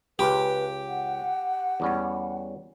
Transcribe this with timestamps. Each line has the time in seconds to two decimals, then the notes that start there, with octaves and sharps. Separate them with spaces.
0.19 C#2 C#3 G4 B4
0.88 F#5
1.80 E2 G3 C#4